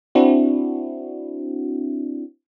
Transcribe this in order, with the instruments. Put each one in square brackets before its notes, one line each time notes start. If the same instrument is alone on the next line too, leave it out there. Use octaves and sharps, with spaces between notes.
[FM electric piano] C4 D4 E4 F#4